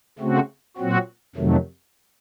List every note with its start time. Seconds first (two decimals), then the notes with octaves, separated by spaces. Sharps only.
0.19 C#3 A3 C4 F#4
0.77 A#2 F#3 C4 F#4
1.35 F2 C3 D#3 F#3 A3